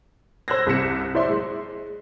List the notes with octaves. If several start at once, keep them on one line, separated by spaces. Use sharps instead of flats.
C5 E6 F#6 G#6 A#6
C2 C3 B6 C#7 E7
E4 C5 D5 E5 C6
G#3